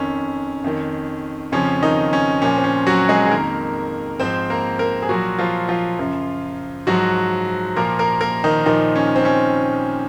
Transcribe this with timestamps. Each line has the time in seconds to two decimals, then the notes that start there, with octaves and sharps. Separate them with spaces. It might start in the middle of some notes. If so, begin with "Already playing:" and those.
Already playing: F2 D#3 C#4
0.64 F2 D#3
1.52 F2 C#3 F3 C#4
1.82 D#3 D#4
2.13 C#4
2.42 A#2 F3 C#4
2.57 C4
2.64 C#4
2.87 F#3 F#4
3.09 G#3 G#4
3.26 G#4
3.31 F2 D#3 A#3 A#4
4.20 G#2 F3 C4 C5
4.50 A#3 A#4
4.79 A#3 A#4
5.02 G#4
5.09 A#2 F3 F#3 F#4
5.39 F3 F4
5.69 F3 F4
5.99 F#2 C#3 F3
6.87 G#2 F3 F#3 F#4
7.76 A#2 F3 A#3 A#4
7.99 A#3 A#4
8.21 A#3 A#4
8.44 D#3 D#4
8.66 A#2 D#3 F3 D#4
8.96 C#4
9.16 C4
9.25 C#4